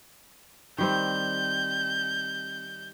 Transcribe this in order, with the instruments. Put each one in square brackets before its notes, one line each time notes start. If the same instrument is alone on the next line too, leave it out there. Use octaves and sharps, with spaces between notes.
[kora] D#3 G3 C4 [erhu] G6